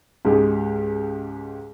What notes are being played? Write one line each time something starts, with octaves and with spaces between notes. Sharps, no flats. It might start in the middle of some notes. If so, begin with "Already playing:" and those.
C#2 G#2 G4 G#4